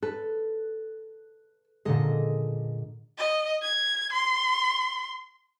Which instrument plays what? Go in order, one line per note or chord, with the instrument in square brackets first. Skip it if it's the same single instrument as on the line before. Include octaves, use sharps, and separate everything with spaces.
[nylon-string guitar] A4 [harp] B4
[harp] A#2 D3 G#3 [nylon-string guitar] A4 D#5
[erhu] D#5
G#6
C6